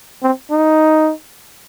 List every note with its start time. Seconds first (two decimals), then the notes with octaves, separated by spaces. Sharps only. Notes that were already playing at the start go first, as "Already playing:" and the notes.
0.23 C4
0.51 D#4